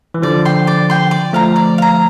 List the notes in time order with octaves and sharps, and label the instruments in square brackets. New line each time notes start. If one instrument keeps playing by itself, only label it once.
[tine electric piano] E3
[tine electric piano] D3 F3 [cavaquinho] D5
[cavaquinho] G5 C6
D5
G5 C6
D5
[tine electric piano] F3 A3 [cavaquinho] F5 A#5
[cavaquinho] D5
F5 A#5